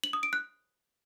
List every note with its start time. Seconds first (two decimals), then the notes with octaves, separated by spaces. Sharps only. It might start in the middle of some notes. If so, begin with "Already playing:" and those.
0.04 F#7
0.13 D#6
0.23 D7
0.33 F#6